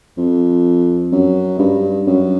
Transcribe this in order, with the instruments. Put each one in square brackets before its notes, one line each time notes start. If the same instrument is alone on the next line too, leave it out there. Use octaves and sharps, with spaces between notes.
[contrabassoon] F2
F#2
G2
F#2